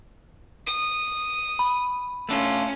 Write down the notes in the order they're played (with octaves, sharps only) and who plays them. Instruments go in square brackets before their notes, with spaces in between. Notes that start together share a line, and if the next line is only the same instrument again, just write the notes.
[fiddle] D#6
[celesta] B5
[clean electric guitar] A3 D4 F4 [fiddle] C#4